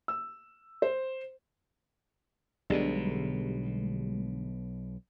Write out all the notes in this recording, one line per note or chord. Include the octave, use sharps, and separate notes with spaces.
E6
C5
B1 B2 D3 G3 G#3